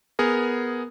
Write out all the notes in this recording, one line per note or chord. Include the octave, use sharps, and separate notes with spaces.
B3 G#4 A#4